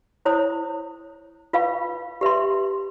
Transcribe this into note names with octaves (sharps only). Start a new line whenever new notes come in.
E4 C5 C#5 A#5 D#6
F4 B4 F5 C#6
G4 B4 E5 C6